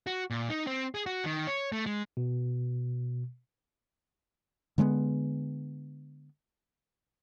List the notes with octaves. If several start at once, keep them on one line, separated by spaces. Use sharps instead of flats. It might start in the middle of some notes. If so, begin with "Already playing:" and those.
F#4
A#2
D#4
C4
G#4
F#4
D#3
C#5
A3
G#3
B2
D3 G#3 A#3 B3